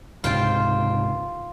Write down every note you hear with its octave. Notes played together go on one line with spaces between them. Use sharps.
C#2 G#2 C3 F4 C5 G5